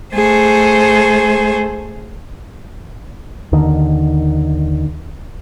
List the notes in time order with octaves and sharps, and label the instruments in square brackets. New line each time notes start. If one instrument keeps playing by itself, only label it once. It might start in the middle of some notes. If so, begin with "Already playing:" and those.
[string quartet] A3 G#4 C5
[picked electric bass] D#2 D3 D#3